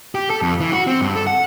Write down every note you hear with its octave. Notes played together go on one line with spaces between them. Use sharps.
G4
A4
F2
E3
F#4
C4
G2
A4
F#5